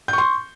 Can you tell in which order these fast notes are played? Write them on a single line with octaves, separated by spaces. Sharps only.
G6 C#6 C6